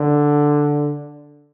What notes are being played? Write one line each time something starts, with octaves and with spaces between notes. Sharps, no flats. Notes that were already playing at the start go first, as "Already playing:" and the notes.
Already playing: D3